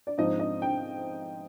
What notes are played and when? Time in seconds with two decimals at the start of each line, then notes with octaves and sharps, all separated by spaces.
0.07 D5
0.18 G#2 F3 C4 D#4 D#5
0.40 D#5
0.62 G5